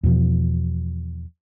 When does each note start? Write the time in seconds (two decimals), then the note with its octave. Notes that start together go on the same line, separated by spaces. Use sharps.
0.03 E2 B2 F3